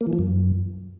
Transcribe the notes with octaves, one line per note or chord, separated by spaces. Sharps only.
A#3
E3
F3
F#2